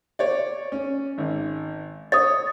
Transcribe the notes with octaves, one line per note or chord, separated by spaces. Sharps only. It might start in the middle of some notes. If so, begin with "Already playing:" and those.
C#5 D5
C#4
G#1
C#5 D#6 A6